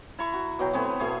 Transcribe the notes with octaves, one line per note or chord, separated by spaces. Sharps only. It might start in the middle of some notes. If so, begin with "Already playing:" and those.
E4 A#5 C#6
F#4
B2 F#3 G5
A3 B3 C4 C#5
B2 A3 G#4 C#6